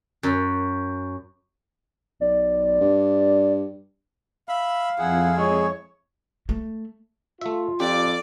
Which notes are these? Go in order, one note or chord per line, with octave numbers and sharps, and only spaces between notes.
F#2
B1 D5
G2
E5 F5 B5
F2 E4 G#4 F#5
G#3 C#5
A3
A3 F4 E5
F2 G4 D5 D6